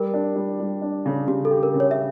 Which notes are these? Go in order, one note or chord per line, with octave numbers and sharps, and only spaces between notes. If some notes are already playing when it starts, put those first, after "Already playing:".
Already playing: G3 A#4
D4
G3
G3
D4
C#3
C#3 G4
A4
G4
A#4
C#3
C#5
E5